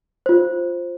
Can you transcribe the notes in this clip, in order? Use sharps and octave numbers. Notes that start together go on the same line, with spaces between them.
F4 C5